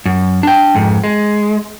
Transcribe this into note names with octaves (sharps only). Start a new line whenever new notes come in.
F#2
D4 G5
F2 G#2
G#3